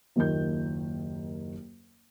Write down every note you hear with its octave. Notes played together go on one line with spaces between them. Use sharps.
F#1 D#2 D#3 F4 A#4 G6